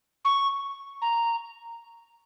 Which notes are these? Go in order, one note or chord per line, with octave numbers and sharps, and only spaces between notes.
C#6
A#5